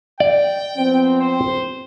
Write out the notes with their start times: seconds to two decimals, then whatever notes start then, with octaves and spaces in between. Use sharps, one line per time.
0.20 D5 G5
0.76 F3 B3 C4
1.20 C5